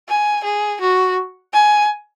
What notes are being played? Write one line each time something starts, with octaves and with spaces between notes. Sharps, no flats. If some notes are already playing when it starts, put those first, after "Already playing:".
G#5
G#4
F#4
G#5